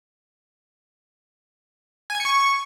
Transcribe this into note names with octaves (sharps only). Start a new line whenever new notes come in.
G#5
G#6
C#7
C#6